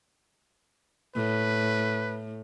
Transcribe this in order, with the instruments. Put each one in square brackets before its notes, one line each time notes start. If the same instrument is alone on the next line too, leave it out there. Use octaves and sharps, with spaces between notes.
[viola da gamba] A2 [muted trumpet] B4